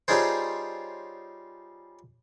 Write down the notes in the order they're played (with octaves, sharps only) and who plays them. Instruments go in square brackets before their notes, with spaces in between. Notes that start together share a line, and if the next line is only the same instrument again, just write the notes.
[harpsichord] G3 C#4 D#4 F4 G#4 C5